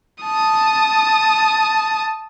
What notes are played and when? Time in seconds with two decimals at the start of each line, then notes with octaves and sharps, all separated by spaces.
0.24 A5 D#6